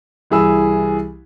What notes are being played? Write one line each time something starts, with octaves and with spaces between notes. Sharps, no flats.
C2 E3 G#4 B5 E6